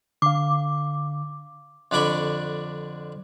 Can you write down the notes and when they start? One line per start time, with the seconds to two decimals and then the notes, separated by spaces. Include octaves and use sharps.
0.22 D3 F5 D6
1.91 F2 D3 D4 D5 B5 C#6